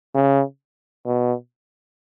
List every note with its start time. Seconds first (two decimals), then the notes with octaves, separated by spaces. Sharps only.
0.15 C#3
1.06 B2